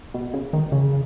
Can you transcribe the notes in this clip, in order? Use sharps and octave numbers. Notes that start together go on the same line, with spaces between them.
B2
C#3
D#3
C#3